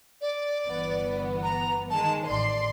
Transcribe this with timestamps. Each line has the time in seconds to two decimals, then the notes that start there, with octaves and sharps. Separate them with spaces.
0.21 D5
0.67 G1 E3 B3
1.43 A#5
1.90 D#3 G#3 A5
2.27 A1 D5 C6